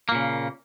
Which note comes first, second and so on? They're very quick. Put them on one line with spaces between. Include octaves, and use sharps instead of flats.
A#3 A#2 C#3